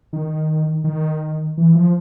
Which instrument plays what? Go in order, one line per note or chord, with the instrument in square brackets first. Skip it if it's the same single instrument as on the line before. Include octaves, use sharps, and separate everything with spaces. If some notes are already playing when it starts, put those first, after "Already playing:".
[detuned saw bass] D#3
D#3
E3
F3